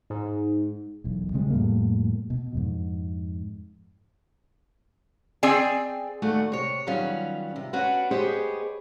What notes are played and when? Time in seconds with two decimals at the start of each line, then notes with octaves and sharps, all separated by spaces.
0.10 G#2
1.04 E1 B1
1.34 C#3 G3 G#3 C4
1.50 F2 A2 G3 A#3
2.30 B2
2.55 F2 G#2
5.43 C4 G#4 D5 G5 G#5
6.22 D#2 A3 F#4 D5 G#5
6.52 C3 C#5
6.87 D#3 F#3 G3 B3 C#4 F4
7.56 C3
7.73 B3 C#4 D4 F#4 B4
8.11 B3 G4 G#4 C5 C#5 D#5